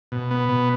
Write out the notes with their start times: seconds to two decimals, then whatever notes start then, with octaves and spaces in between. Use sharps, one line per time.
0.12 B2
0.31 B3
0.49 B2